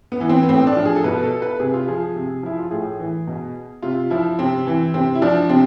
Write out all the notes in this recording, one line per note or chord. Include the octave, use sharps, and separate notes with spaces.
B3
E3
C4
B3
A2 C4
D4
F3
G#4
A4
B2 B4
A4
B4
C3 G#4
F4
F3 G#4
C3
F3 E4
F4
A2 G#4
E3
B2
C3 F4
F3 E4
C3 C4
E3
C3 C4
E4
F3 D4
C3 C4